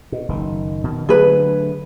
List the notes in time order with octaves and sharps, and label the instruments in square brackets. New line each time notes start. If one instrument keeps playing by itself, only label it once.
[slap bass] B2
F#1 D#3
B2 D#3
[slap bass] D3 F#3 A3 [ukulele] G#4 B4